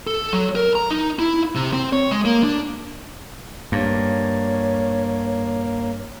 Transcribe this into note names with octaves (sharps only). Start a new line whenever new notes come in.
A4
F#3
A#4
A#5
D#4
E4
C3
C4
C#5
G#3
A#3
D4
G2 A#3 C#5